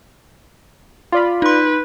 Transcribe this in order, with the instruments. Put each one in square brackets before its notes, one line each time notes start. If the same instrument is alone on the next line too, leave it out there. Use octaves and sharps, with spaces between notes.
[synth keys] F4 D5 B5
[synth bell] D#4 C6 [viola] B4